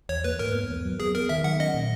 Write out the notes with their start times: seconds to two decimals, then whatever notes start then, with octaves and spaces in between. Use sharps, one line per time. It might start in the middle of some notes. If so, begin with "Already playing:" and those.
0.09 E2 C#5
0.24 A#3 B4
0.39 G#2 A#4
0.55 B3
0.69 E2
0.85 F#3
1.00 B3 G#4
1.15 B3 A#4
1.29 D#3 E5
1.44 F#3 F#5
1.60 C#4 D#5
1.74 A#2